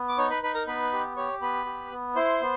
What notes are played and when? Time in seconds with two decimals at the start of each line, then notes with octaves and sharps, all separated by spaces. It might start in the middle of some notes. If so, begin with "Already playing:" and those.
Already playing: B3
0.09 D6
0.18 D#4 C#5 C#6
0.30 B4 B5
0.43 D#4 B4 B5
0.55 A#4 A#5
0.67 B3 B4 B5
0.93 G4
1.17 G4 C#5 C#6
1.42 B3 B4 B5
1.66 G4
1.92 B3
2.15 E4 C5 C6
2.41 B3